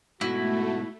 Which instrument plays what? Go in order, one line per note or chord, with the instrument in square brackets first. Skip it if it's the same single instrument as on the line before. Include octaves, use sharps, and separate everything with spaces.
[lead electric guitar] G#2 B2 [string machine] A3 [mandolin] E4 [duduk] F#4